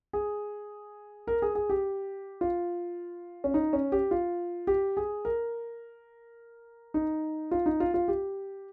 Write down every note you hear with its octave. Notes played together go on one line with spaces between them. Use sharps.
G#4
A#4
G#4
G#4
G4
F4
C#4
D#4
C#4
G4
F4
G4
G#4
A#4
D#4
F4
D#4
F4
F4
G4